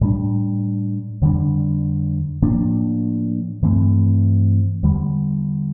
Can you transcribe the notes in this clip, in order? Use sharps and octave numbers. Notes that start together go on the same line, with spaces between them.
A2 G3 D4
F2 D3 G3 D4
A2 F3 A#3 D4
G2 E3 A3 C4
E2 D3 G3